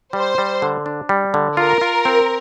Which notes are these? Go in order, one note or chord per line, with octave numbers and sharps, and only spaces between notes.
G3 C5
G3
D3
D4
G3
D3
F4 A#4
F4
C4